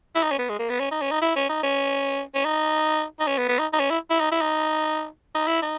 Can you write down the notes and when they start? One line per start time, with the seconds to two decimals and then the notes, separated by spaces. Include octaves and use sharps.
0.15 E4
0.23 D#4
0.32 C#4
0.38 B3
0.49 G#3
0.59 A#3
0.70 B3
0.80 C#4
0.91 D#4
1.02 C#4
1.11 D#4
1.22 E4
1.36 C#4
1.49 D#4
1.63 C#4
2.35 C#4
2.45 D#4
3.20 D#4
3.27 C#4
3.38 B3
3.49 B3
3.59 D#4
3.73 D#4
3.80 C#4
3.90 E4
4.10 E4
4.20 D#4
4.32 E4
4.41 D#4
5.35 D#4
5.47 E4
5.62 D#4